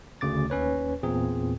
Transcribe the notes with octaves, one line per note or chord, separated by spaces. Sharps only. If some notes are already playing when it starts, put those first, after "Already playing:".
D2 C#3 D6 A6
D#2 C#4 B4 C#5
E2 A#2 C4 G#4